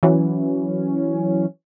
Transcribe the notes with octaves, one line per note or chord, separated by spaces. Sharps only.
E3 F#3 C#4